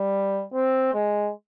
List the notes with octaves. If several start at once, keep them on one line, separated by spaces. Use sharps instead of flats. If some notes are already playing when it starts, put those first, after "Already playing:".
Already playing: G3
C4
G#3